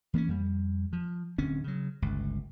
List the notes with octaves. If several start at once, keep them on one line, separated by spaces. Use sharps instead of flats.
E3 A#3 B3 C#4
F2 G3
F3
D1 D3 C4 C#4
C#3 F#3
G1 C#2 G2